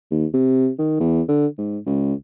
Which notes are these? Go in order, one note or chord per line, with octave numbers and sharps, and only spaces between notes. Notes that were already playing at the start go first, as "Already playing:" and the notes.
D#2
C3
D#3
E2
D3
G#2
C#2